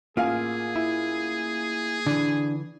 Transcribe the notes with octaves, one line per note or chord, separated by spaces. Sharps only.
A1 A#3 F4 G#4 F5 G#5
E4
D3 E3 D4